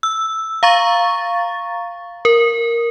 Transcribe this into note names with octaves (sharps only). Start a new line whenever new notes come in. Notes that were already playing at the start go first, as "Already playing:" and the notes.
E6
F5 A#5 C#6 A6
A#4